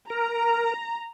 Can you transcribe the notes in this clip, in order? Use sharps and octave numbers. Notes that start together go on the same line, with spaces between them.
A#4 A#5